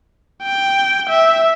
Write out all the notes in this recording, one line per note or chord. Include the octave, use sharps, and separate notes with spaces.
G5
E5